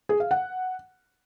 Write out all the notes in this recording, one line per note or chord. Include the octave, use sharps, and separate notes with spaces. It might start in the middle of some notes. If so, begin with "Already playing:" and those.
G#4
F5
F#5